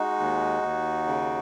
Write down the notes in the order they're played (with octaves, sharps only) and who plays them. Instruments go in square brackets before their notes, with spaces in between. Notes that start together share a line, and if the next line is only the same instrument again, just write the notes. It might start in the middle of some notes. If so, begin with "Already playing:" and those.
Already playing: [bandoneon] G#3 D#4 F#4
D#2
D#2
C#3